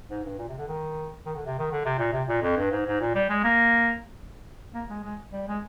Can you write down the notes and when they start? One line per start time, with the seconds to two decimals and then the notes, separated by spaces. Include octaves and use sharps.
0.11 G#2
0.25 G2
0.39 A#2
0.49 C3
0.59 D3
0.68 D#3
1.26 D#3
1.36 D3
1.46 C3
1.59 D#3
1.72 D3
1.85 C3
1.99 A#2
2.13 C3
2.28 A#2
2.42 F2
2.57 G2
2.71 G#2
2.87 G#2
3.01 A#2
3.15 G3
3.30 G#3
3.44 A#3
4.74 A#3
4.90 G#3
5.04 G#3
5.33 G3
5.48 G#3